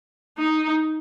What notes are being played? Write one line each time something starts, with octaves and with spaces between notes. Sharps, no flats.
D#4